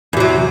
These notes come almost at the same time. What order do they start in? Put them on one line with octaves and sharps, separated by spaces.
E2 C3 F#3